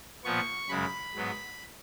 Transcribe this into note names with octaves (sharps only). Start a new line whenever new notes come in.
A#2 F3 B3 C#6
F#2 C#3 G#3 B5
G#2 F#3 B3